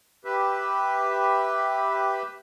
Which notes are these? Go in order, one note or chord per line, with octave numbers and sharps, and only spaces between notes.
G4 B4 E5